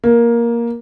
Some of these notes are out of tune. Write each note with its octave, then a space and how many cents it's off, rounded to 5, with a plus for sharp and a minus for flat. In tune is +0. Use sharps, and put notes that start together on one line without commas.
A#3 +10